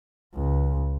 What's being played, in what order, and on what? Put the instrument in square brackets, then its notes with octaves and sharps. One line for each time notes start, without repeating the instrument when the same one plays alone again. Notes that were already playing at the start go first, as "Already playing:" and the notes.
[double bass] C#2